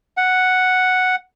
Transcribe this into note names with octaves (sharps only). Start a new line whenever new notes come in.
F#5